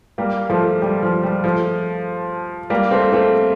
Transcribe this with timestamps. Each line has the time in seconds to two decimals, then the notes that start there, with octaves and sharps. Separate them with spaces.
0.18 G3 A#3
0.50 F3 A3
0.82 G3
1.02 F3
1.23 G3
1.44 F3 A3
2.70 G3 A#3
2.91 A3 C4
3.12 A3 C4